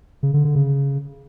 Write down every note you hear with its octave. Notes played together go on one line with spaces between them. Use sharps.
C#3
D3
D3
C#3